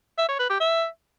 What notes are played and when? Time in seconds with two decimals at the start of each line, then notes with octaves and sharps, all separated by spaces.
0.18 E5
0.29 C#5
0.39 B4
0.50 G4
0.60 E5